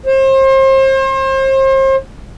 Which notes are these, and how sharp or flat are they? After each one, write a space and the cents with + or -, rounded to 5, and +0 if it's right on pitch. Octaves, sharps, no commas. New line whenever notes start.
C5 +35